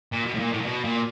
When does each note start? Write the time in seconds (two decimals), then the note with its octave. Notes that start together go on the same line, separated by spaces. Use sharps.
0.12 A#2
0.26 B2
0.34 A2
0.39 A#2
0.52 A2
0.61 A#2
0.66 B2
0.84 A#2